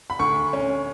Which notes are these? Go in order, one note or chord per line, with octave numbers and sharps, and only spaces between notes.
B5
D2 C#6
C#4